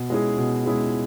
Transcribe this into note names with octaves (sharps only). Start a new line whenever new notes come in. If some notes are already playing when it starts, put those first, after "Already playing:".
Already playing: B2
G#3 C#4 E4 G#4
B2
G#3 C#4 E4 G#4